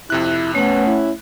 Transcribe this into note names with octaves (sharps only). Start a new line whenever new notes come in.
F2 C3 E4 F#6
A3 B3 C#4 F#5
E4